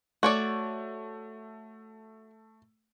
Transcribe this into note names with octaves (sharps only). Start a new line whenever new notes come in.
A3 F#4 C#5 D5